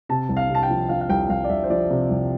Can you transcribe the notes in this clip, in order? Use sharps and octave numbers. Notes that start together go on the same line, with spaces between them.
C3 A5
C2
F5
C3
A5
G5
F3
F3 F5
F5
C2 G5
C2 F5
D5
C2 E5
C5
F3 D5
C3
C2